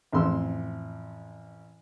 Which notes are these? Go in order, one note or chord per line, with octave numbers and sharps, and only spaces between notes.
A1 F2 C6 E6